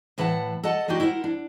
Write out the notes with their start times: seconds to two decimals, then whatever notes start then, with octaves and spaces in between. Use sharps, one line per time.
0.18 A2 E3 B4 F#5 A5
0.63 A4 D#5 F#5 A5
0.88 G#3 D4 D#4 F#4 G4
1.00 E4 A#4 C5 F5 F#5
1.24 D4